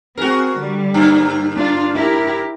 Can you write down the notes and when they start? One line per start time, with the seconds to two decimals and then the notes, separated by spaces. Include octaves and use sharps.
0.17 C4 F#4 G#4 A#4
0.57 D3 G3
0.94 G2 A#3
1.55 D4 F4
1.94 E4 G4 A#4